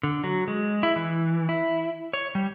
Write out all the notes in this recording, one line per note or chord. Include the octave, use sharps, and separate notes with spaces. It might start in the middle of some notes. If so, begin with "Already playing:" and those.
D3
F#3
G#3
E4
E3
E4
C#5
G3